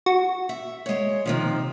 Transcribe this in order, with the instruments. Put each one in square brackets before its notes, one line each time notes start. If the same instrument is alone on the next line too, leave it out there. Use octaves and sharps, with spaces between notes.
[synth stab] F#4
[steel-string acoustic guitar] E5
G#3 C#5
C3 D#3 F3